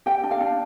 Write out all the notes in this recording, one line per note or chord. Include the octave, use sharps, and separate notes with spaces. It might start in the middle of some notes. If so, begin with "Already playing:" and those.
G4 G5
D4
F5
D4